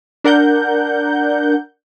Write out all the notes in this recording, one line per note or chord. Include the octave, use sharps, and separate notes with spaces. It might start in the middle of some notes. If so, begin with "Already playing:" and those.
D4 A#4 F#5 G6